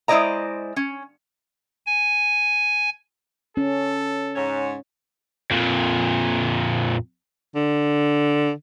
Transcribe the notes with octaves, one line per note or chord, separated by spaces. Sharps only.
G#3 E4 C5 D5 D#5 A#5
C#4
G#5
C#4 A4
G#2 C#5
F2 A#2
D3